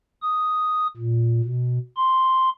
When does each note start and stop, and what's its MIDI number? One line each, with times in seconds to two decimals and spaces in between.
0.22 0.87 87
0.97 1.41 46
1.44 1.79 47
1.97 2.49 84